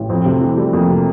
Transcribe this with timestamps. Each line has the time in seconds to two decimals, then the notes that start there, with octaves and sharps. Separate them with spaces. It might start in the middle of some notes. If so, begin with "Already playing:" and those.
Already playing: A1
0.09 F2 C4
0.25 C3 A3
0.41 E3
0.57 G3 A3
0.73 F2 A#3
0.89 C3